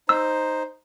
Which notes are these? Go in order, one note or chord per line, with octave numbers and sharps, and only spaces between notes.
D#4 C5 E6